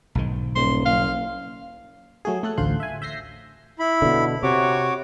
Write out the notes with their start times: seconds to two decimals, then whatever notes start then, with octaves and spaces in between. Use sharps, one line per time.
0.15 B1 G#2 D#3
0.56 D#1 C6
0.86 F#1 F5
2.25 F#3 A3 F#4 G#4
2.43 A3 A4 F#6
2.57 A1 D2 F4 C5 C6 F#6
2.80 E5 G#5
3.02 E5 G6 A#6 C7
3.79 E4 B5
4.02 B2 D3
4.43 C3 F#4 C#5 D6